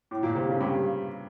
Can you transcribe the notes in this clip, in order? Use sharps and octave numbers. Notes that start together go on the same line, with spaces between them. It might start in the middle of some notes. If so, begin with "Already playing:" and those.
A2
A#2
C3
C#3
G2